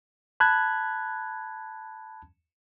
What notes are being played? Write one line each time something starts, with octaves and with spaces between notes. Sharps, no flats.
A5 B5 F#6 G#6